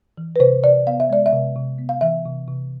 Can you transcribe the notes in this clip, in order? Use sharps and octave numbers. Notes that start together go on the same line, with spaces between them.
E3
B4
C3 C5
C3 D5
B3 F5
E5
G#3 D5
E5
C3
C3
B3
F5
E3 E5
C3
C3